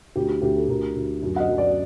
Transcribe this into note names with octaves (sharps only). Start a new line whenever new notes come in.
D2 G4
G4
D2 G4
A4
D2 A#4
D2
F#2
F#5
D#5
F#2
D5